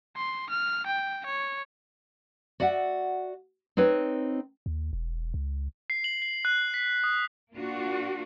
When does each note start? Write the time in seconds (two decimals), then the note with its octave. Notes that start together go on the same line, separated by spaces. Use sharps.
0.16 C6
0.50 F6
0.87 G5
1.26 C#5
2.60 F#4 D5 E5 F#5
3.77 C4 D#4 B4 C#5
4.66 D#2
4.93 E1
5.34 C#2
5.90 C7
6.04 F#7
6.22 C7
6.45 F#6
6.74 B6
7.04 D#6
7.53 A#3 D4 F4 F#4